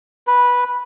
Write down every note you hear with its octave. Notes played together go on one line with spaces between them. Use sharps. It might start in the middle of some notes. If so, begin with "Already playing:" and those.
B4